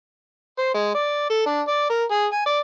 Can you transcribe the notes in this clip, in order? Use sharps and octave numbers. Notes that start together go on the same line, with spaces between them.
C5
G#3
D5
A4
D4
D5
A#4
G#4
G#5
D5